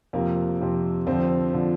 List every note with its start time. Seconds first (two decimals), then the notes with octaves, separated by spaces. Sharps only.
0.13 F2 C3 F3 A#3
0.60 F2 C3 F3
1.07 F2 D3 F3 C4
1.53 D3 F3